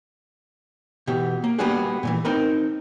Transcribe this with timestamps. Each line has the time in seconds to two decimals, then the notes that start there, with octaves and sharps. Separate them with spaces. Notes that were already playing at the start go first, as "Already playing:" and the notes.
1.07 B2 E3 G4
1.44 A#3
1.59 G3 A#3 B3 D4 F#4 G#4
2.03 A#2 C#3 E3
2.25 C4 D#4 A#4 B4